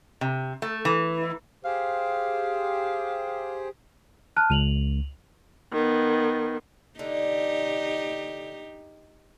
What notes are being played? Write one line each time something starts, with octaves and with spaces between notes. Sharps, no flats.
C3
A3
E3
G4 G#4 C5 F5
A5 F6 F#6
C#2 D#7 F7 F#7
D#3 B3
D3 D#4 G4